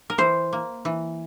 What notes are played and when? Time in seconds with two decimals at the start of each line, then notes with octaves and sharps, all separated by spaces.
0.10 A#4
0.18 E3 C5
0.53 A#3
0.85 E3